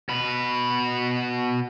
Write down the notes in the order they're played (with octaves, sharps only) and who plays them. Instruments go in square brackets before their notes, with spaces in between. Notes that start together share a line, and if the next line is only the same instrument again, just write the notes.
[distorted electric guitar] B2 B4